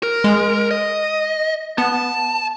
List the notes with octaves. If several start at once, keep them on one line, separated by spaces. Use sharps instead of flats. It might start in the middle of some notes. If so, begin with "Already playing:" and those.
A#4
G#3
D#5
B3 A5